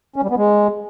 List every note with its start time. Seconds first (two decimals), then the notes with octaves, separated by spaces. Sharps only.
0.16 C#4
0.23 G3
0.30 B3
0.37 G#3